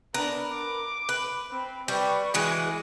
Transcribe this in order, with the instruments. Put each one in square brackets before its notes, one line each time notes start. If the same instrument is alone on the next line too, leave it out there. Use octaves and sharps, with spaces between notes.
[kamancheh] B3 D4 [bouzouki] A#4 B4
[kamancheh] D6
[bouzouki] B4
[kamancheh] C4 B5
[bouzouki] G3 [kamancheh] B4 C#6
[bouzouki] E3 G#3 F#4 [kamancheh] G#4